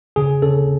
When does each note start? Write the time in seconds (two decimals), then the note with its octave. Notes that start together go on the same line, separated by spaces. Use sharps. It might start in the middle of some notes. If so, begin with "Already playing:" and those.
0.16 C#3 G#4
0.42 C#3 A4